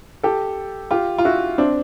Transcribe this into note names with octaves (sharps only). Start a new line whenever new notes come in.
G4 A4
F4 G4
F4
E4 F#4
C4 D4